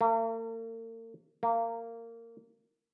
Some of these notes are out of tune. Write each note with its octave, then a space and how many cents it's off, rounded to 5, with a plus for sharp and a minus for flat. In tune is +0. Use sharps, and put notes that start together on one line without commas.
A#3 -45
A#3 -20